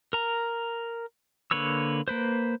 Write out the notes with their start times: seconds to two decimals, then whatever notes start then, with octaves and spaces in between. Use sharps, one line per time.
0.13 A#4 A#5
1.51 D3 A#3 B4 C#5 E6
2.08 A#3 B4 C5